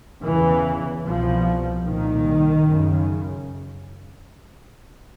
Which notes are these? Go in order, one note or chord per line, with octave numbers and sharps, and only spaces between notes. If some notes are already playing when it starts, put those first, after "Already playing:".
E2 C#3 E3
C2 B2 F3
C2 A#2 D#3
F#2 C#3